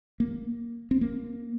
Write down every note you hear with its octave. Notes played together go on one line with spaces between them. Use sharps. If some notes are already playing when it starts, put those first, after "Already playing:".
A#3
C4
A#3